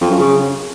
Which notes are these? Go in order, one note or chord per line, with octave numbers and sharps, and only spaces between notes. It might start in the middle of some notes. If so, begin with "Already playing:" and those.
F2
F#2
C#3